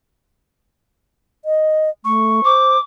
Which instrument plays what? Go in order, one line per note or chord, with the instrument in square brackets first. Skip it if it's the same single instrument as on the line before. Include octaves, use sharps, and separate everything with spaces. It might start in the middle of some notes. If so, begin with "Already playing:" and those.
[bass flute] D#5
[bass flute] A3 [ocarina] C#6
[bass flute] C5 [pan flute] D6